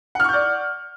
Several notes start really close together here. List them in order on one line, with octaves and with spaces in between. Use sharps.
F#5 F6 C#6 G6 D5